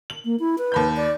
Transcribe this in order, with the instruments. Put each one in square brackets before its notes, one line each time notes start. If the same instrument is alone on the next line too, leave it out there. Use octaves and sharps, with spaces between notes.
[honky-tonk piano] F#7
[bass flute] A#3
E4
B4
[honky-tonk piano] D#2 B5 G6
[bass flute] D5